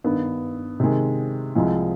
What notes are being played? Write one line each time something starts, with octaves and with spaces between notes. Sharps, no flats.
G2 D#3 B3
C3 D#3 G#3
C2 C3 F3 G#3